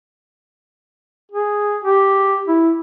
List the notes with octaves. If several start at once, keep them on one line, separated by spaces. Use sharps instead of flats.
G#4
G4
E4